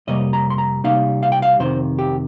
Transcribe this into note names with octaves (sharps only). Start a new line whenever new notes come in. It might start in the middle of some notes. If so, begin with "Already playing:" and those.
F2 C3 G3 A#3 D#5
A#5
C6
A#5
C3 G3 A#3 D#4 F5
F5
G5
F5
F2 C3 D#3 C5
G4